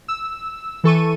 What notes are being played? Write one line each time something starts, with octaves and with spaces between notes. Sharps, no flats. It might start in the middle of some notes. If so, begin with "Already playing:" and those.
E6
E3 A4 C#6 D#7